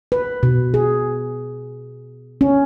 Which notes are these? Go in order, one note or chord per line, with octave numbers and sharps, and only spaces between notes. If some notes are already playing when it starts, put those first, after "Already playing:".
B4
B2
G#4
C#4